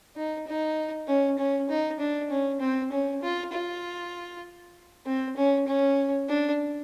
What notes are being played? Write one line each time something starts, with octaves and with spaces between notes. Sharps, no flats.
D#4
D#4
C#4
C#4
D#4
D4
C#4
C4
C#4
F4
F4
C4
C#4
C#4
D4